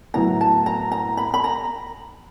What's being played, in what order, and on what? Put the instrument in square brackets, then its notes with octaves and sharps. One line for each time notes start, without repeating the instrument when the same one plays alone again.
[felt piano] A2 F#3 B3 E4 [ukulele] A#5
[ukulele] A5
A#5
A#5
B5
B5
A#5